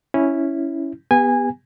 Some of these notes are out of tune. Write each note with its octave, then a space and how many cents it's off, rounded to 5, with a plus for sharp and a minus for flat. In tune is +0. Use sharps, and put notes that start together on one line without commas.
C#4 +0 E4 -5
B3 +0 G4 +30 G#5 -15